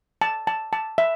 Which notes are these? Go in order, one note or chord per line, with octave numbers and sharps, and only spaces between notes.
A5
A5
A5
E5